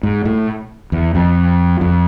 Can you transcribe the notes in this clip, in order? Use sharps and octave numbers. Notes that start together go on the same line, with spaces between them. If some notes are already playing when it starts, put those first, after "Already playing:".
G#2
A2
E2
F2
F2